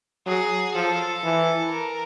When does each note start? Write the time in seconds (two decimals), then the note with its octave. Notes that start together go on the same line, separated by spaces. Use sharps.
0.26 F#3 G#4
0.75 F3 A4
1.24 E3
1.71 A#4